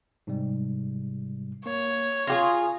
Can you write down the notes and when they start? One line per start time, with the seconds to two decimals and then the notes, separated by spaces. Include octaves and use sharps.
0.27 G#2 C3 G3
1.66 A#3 C#5
2.27 F4 G4 G#4 C#6 A#6